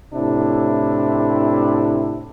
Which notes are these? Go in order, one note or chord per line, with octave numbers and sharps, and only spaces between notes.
A2 C3 D4 E4